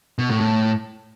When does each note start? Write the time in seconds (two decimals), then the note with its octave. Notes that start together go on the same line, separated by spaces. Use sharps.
0.19 B2
0.30 A2
0.41 A2